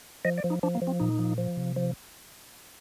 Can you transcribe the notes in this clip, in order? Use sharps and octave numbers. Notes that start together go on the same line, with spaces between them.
F3 D#5
D5
F3
D#4
F3 D4
A#3
F3
C4
A#2 D#4
F3
F3
C3
F3